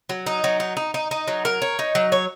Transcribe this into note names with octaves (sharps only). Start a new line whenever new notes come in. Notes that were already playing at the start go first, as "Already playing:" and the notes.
F#3
D#4
F#3
D#4
D#4
D#4
D#4
F#3
A#4
C#5
D#4
F#3
C#5